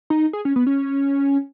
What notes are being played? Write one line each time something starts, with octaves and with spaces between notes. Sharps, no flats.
D#4
G#4
C#4
B3
C#4